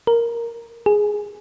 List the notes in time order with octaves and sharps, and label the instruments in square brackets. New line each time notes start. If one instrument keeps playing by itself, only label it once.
[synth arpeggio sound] A#4
G#4